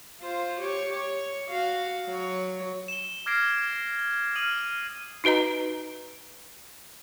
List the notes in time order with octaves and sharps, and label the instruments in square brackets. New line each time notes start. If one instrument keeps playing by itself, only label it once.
[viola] F4 C5
G4 C#5
C#5
F#4 F5
F#3 C#5
[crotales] E7 G7
D6 F6 G#6 A#6 C7 D7
D#6 F6 D#7 F#7
[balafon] D#4 F#4 B4 D#5 A#5